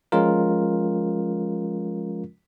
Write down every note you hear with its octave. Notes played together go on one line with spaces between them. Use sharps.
F3 G#3 C#4 F4 A#4